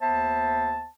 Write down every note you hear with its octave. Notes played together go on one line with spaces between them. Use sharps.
D#2 B3 C5 E5 A5